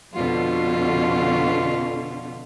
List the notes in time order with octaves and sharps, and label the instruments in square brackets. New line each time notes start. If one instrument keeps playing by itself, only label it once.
[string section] F2 B2 D3 [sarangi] F4